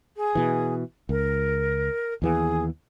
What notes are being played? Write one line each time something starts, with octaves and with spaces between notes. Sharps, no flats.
G#4
B2 E3
C#2 A#4
D#2 E3 B3 G#4